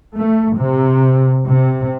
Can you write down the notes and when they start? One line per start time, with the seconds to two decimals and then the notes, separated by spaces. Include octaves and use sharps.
0.16 A3
0.56 C3
1.44 C3